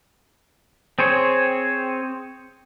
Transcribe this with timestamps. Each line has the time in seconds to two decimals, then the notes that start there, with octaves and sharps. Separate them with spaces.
0.99 C4 G#4 C5 C#5